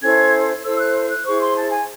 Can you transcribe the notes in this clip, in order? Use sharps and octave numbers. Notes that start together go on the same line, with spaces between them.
C#4 E4 A4 C5 G#6
E4 A4 C5 E6
F#6
F#6
E4 G#4 C5 C#6
C6
A5
G#5